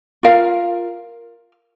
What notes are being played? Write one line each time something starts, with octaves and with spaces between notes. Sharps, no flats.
F4 A#4 F5